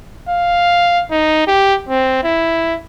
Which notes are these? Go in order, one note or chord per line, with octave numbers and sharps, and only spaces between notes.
F5
D#4
G4
C4
E4